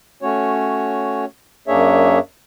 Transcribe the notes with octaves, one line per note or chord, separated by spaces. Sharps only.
A3 C#4 F#4 C#5
F#2 A#3 D4 G#4 C#5 E5